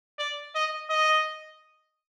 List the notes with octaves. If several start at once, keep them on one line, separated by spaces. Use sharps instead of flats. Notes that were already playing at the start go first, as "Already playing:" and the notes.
D5
D#5
D#5